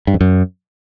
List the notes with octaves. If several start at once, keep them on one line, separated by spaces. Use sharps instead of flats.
G2
F2
F#2